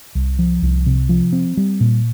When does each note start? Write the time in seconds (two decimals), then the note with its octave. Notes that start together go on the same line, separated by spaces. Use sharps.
0.15 C2
0.39 F3
0.62 C2
0.86 C3
1.09 F3
1.32 C4
1.57 G3
1.80 A#2